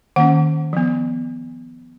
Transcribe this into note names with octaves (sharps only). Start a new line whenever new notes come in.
D#3 A#3 C#4 F#5
F3 B3